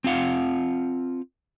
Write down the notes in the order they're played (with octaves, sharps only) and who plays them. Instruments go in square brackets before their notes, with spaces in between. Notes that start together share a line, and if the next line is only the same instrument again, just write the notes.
[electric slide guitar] C4 F4 F5 F#5